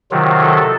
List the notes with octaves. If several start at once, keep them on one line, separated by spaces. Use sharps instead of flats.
C3 D#3 F#3 F4
A4